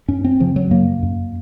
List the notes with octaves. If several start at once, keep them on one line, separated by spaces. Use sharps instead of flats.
F#2 C#4
C4
C#3 F3
F#3
F#2 A#3
F#2